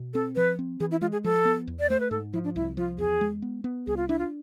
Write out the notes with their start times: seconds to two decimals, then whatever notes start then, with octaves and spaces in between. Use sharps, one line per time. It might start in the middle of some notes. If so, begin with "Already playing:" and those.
Already playing: B2
0.14 C4 A4
0.36 F3 B4
0.59 C4
0.80 E3 G#4
0.91 E4
1.01 G#3 F4
1.12 G#4
1.24 F3 A4
1.45 B3
1.67 E2
1.80 D5
1.90 A3 C5
2.00 B4
2.11 G#2 A4
2.33 F3 E4
2.44 D4
2.56 C2 E4
2.77 F3 F4
2.98 E2 G#4
3.21 G#3
3.42 B3
3.64 B3
3.87 C2 G#4
3.97 F4
4.08 D4 E4
4.19 F4